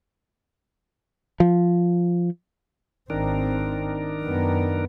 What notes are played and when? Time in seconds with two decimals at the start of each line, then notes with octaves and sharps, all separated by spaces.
1.40 F3
3.10 G#1 D#3 C4 D4 A#4
4.23 F#2 B3